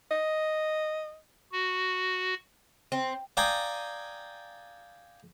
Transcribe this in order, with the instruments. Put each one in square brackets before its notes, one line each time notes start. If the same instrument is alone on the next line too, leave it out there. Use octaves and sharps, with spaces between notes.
[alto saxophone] D#5
[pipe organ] F#4
[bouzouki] C4
[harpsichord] D5 F5 G5 G#5 A#5 D#6